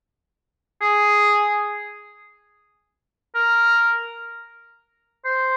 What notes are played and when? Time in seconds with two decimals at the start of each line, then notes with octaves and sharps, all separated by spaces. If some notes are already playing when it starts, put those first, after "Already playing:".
0.82 G#4
3.35 A#4
5.25 C5